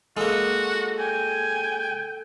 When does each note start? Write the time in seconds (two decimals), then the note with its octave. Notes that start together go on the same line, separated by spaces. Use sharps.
0.17 G#3 A#3 F#4 A4
0.99 G5 G#5